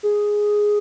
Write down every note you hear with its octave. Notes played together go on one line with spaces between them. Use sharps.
G#4